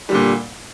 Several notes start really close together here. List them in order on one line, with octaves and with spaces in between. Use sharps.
G3 D3 A#2